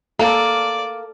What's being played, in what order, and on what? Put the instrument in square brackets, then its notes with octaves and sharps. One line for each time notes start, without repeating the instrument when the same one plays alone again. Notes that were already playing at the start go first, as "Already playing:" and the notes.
[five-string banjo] A#3 [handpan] A4 [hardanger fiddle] D5